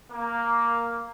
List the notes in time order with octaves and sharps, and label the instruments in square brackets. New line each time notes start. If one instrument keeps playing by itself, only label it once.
[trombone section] A#3